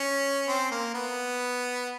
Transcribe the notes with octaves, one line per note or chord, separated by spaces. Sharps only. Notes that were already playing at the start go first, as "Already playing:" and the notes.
Already playing: C#4
C4
A#3
B3